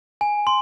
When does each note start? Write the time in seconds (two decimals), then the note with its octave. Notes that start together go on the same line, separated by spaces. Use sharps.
0.21 G#5
0.47 C6